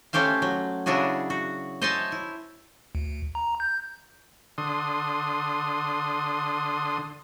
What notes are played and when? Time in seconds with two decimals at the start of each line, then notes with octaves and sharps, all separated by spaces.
0.13 A3 C#4 G4 C5 F5
0.42 F#3
0.86 C#3 F#3 D4 E4 F#4 G#4
1.30 F#4
1.81 C5 C#5 D#5 E5 G#5 A5
2.12 E4
2.95 D2
3.35 A#5
3.60 G6
4.58 D3 C6 D#6